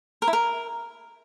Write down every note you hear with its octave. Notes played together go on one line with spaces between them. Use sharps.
A#4
E4
A#4